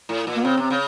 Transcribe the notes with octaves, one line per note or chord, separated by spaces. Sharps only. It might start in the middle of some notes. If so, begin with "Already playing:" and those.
A2
A#2
A#3
C#3 C4
C3 C4
C#3